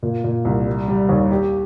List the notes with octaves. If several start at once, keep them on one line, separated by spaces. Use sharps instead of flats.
A#2
A#2
C2
G3
G3
D#2
G4